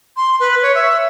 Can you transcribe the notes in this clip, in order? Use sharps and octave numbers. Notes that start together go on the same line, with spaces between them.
C6
B4
C#5
E5